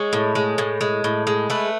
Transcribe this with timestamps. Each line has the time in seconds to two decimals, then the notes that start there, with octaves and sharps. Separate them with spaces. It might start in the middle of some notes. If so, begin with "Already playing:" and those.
Already playing: G#3 C#5
0.13 A2
0.35 G#3
0.58 A2
0.81 G#3
1.04 A2
1.27 G#3
1.50 A3 B4